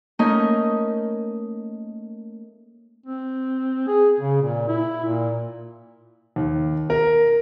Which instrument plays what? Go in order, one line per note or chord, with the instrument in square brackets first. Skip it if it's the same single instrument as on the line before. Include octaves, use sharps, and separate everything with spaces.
[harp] A3 A#3 C#4 D#4 A#4 D#5
[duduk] C4
G#4
C#3
A#2
E4
A#2
[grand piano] D#2
A#4